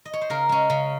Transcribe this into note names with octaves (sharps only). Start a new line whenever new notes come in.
D#5
C#5
C5
C#3 A#4
G#3 C#4
C#3